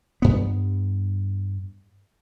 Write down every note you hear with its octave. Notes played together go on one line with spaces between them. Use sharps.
G2 B3